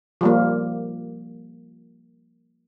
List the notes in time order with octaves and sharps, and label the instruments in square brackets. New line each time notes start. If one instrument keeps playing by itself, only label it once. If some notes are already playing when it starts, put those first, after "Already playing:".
[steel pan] F3 G3 A#3